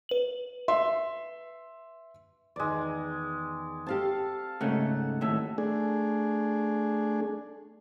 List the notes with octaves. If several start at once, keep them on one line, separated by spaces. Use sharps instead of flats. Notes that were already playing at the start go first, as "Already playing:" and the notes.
B4 F#7
E5 C6
E2 D#3 G#3 D5
C4 F#4 G4 A4 F5 A5
G#2 C#3 A3 A#4 F#5
D#2 A2 A4 E5
A3 D4 G#4